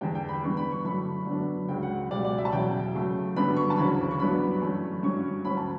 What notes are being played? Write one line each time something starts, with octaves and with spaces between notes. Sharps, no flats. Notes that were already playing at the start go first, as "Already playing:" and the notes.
E2 D3 G3 D4 G5
G5
B5
G2 E3 B3 C#6
B5
C#6
F#2 D3 A3 D4 B5
F#2 D3 F#3 B3 D4
C#2 C#3 F#3 G5
F#5
C#2 B2 G3 D5
D5
E5
A5
E2 B2 F#3 C#4 G5
C#3 F#3 A3
G2 D3 F#3 B3 D4 B5
C#6
A5
D2 C#3 E3 B5
C#6
G2 F#3 B3 D4 B5
F#2 E3 A3 C#4
G2 F#3 C#4 C#6
D2 D3 A3 C#4 B5
A5